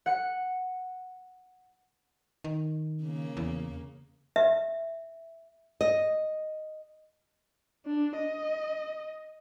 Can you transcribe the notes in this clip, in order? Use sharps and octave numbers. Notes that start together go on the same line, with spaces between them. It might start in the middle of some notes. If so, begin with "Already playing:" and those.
F#5 C#7
D#3
C#3 A#3
E2
E5
D#5
D4
D#5